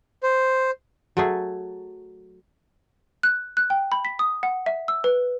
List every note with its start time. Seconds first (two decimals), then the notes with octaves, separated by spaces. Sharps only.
0.23 C5
1.17 F#3 A3 G#4
3.23 F#6
3.57 F#6
3.70 G5
3.92 B5
4.05 B6
4.19 D#6
4.43 F#5
4.66 E5
4.88 E6
5.04 B4